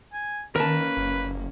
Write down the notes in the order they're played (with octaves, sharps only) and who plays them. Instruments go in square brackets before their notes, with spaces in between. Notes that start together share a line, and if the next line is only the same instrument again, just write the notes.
[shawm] G#5
[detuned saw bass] D#3 [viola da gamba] A#3 C#4 [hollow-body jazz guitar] A#4 A5 [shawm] B4
[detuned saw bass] F#1